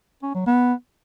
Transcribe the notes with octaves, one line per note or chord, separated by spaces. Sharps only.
C#4
F#3
B3